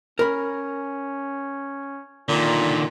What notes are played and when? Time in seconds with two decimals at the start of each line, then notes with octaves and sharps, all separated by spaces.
0.19 C#4 A#4 B5
2.29 A#2 D3 D#3 F4